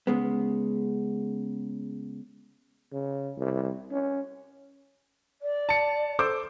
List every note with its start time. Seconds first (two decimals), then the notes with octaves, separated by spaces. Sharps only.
0.07 C#3 G#3 B3
2.92 C#3
3.37 C2
3.91 C#4
5.41 D5
5.69 A5 C#7
6.19 A4 C5 D6